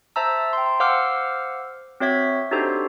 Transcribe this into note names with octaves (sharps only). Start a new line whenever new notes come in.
C5 E5 A5 A#5 E6
G5 C6
C5 F5 F#5 D6 E6 F6
C4 F#4 C#5 E5 G#6 B6
D4 D#4 F#4 G4 A4 C5